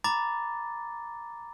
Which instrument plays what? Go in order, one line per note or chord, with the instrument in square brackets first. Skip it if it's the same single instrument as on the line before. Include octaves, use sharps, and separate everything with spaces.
[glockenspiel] A#5 B5 D6 A6